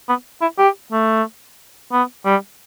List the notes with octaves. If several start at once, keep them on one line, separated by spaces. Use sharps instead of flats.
B3
E4
G4
A3
B3
G3